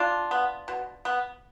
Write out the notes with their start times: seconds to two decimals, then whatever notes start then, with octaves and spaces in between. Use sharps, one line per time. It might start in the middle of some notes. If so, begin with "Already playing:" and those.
Already playing: D4 F4
0.31 B3
0.68 B2
1.05 B3